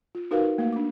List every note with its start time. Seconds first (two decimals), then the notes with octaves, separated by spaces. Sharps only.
0.15 F4
0.31 D#4 F#4 A#4 B4 F5
0.58 A3 A#3 F5
0.72 D4 D6